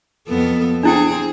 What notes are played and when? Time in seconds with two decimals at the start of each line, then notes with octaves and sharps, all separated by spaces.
0.29 F2 B3 A4
0.83 C4 D4 E4 G#4 G5